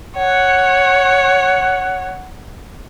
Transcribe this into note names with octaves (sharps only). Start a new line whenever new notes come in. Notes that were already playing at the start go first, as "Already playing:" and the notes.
C#5 F#5